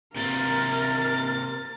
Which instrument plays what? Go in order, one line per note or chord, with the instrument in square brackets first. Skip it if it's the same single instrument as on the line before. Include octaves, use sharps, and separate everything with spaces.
[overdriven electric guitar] C3 A#3 [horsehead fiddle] A#4 [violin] A6